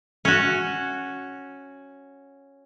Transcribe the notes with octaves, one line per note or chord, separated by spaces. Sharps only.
C#4 F#4